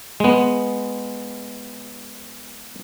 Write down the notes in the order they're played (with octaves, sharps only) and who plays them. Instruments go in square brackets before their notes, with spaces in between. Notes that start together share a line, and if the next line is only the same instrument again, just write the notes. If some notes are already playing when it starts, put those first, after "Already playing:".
[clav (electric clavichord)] G#3 B3